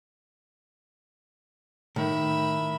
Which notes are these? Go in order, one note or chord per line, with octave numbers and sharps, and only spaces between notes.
A2 D#3 E5 B5